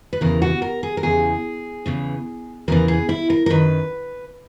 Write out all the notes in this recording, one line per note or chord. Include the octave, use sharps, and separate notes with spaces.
B4
E2 C#3 E3 A#4
F#4
A#4
G#4
A#4
E2 C#3 E3 G#4
E2 C#3 E3
E2 C#3 E3 A#4
G#4
E4
A#4
A#4
F#2 D#3 B4